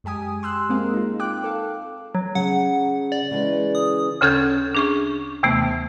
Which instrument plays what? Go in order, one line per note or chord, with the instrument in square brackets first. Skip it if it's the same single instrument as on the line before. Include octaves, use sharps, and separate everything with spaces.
[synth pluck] F#2 G#3 G4 G#5 D#6
C6 E6 F#6
G#3 A#3 C4 G#4 A#4 F5
D#4 F4
G5 D6 F#6
A4 F5
[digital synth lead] F#3
[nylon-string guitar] C#3 [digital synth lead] F#5
[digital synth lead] D5
[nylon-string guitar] C#3 E3 G#3
[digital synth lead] D#6
[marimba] D2 C#3 C#4 A4 G6 G#6
D4 G#4 C#6
D#2 C3 E3 A3 B3